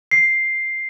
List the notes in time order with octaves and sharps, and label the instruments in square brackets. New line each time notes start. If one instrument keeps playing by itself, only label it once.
[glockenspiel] C7